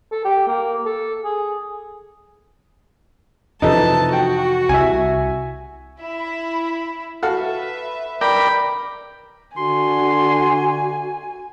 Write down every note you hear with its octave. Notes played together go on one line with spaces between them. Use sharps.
A4
G4
A#3
A4
G#4
F2 C3 E3 D#4 A4 B4 A5
F#4 G5
C2 E5 G#5
E4 E5 B5
F#4 A4 B4 E5 F5
A#4 D5 G5 B5
D3 F#4 G#5 C6